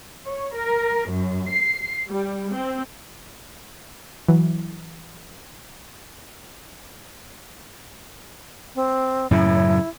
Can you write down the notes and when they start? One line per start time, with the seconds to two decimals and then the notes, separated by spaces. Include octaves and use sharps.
0.28 C#5
0.57 A#4
1.11 F#2
1.52 C7
2.09 G3
2.53 C4
4.28 E3 F#3
8.75 C4
9.31 F#2 A2 C#3 E4